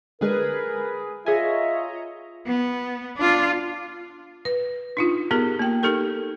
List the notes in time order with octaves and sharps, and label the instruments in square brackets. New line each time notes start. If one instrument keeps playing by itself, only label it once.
[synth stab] D3 G#3 [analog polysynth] G#4 B4 [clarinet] A#4
[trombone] F4 [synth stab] G#4 G#5 [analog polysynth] C#5 D#5 A#5 [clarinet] E5
[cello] B3
D4 F4
[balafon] B4
D4 D#4 F4
B3 G4 G#4 A#4
A#3 G5
D#4 G4 A4 A#4